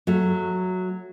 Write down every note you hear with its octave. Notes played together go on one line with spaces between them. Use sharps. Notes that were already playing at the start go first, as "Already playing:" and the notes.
F#3 A3